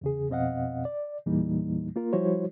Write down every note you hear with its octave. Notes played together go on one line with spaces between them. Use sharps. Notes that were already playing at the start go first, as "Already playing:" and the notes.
E2 C#3 G#4
F2 B2 C4 D#5 F5 F#5
D5
E2 A#2 E3 G3 A#3 D#4
A#3 F4 A#4
F3 G3 E4 F#4 C5 C#5